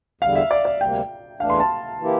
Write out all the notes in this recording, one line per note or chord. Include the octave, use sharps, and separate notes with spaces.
E2 D3 G3 F5
E5
D5
D5
D2 C3 G3 A#3 G5
E2 E3 A3 D4 F5
C6
A5
E3 A#3 E4 G4